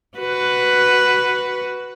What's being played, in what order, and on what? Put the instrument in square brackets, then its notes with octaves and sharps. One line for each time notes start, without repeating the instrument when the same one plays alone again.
[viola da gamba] F#4 B4